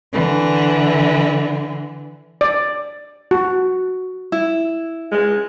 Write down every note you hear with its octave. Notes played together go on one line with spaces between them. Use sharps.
D3 E3
D5
F#4
E4
G#3